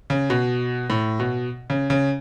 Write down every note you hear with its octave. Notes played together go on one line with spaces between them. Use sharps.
C#3
B2
A2
B2
C#3
C#3